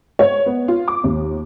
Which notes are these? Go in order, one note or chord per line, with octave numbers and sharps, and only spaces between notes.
C#5
B3
F4
D6
D#2